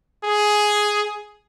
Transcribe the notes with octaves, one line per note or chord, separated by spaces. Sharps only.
G#4